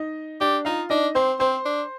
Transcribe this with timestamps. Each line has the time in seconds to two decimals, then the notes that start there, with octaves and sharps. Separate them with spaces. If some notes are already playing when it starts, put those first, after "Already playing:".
Already playing: D#4 D#5
0.41 D4 G4 D5
0.65 D#4 F4 F5
0.90 D4 D#4 D#5
1.15 C4 C5 C6
1.39 C4 C5 C6
1.65 D4